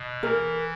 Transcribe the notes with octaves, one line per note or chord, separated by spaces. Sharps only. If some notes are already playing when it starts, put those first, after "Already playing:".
Already playing: B2
E3 A#4